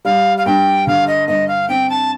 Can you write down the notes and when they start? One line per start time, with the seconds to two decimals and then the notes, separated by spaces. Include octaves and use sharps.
0.05 G3 F5
0.38 F5
0.46 G2 G5
0.87 D3 F5
1.07 D#5
1.28 G2 D#5
1.48 F5
1.68 C4 G5
1.89 A5